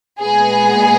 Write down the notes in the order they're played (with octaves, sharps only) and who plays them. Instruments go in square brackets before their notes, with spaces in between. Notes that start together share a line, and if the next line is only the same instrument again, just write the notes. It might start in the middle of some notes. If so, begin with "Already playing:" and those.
[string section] A#2 G#3 B3 G#4